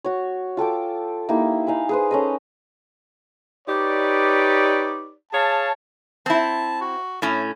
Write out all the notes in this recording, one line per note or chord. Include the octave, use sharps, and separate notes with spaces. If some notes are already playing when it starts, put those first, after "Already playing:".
F#4 C#5
F4 A4 G5 D6
A#3 D#4 E4 G4
D#4 F5 G#5 B5
G#4 B4 C5
C#4 A4 D#5
D#4 G4 B4 C#5 D5
G#4 C#5 F5 A5
C4 E4 A5
F#4
A2 C#4 E4